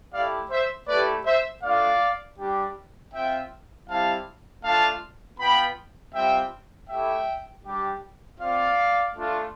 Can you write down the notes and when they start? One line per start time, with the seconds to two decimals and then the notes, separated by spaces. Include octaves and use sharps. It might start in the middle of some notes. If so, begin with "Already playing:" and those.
0.13 A3 E4 G4 D5 F5
0.51 C5 E5
0.88 A3 E4 G4 B4 D5
1.26 C5 E5
1.63 A3 D4 F4 D5 F5
2.39 G3 D4 G4
3.14 C4 F4 E5 G5
3.89 G3 C4 E4 F5 A5
4.64 A3 D4 F4 F5 A5
5.40 B3 F4 G5 B5
6.15 G3 C4 F4 E5 G5
6.89 A3 E4 G4 E5 G5
7.65 G3 D4 G4
8.40 C4 F4 D5 F5
9.16 A3 D4 F4